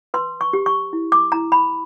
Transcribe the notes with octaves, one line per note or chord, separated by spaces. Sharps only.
B4 C6
C#6
G4
C#6
E4
D6
E4 A#5
B5